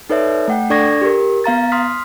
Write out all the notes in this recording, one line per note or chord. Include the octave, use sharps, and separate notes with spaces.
D#4 A4 B4 C#5 D5 E5
A3 F#5 G5
D4 A4 D5 C#6 G#6 A#6
G4 A#4
B3 F5 A#5 A6
C6 D#6 F6 B6